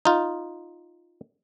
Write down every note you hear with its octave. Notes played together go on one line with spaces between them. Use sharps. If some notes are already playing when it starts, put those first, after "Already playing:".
D#4 F4